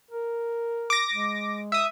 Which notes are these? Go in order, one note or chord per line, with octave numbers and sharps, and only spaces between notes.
A#4
D6 A#6
G#3
E5 D#6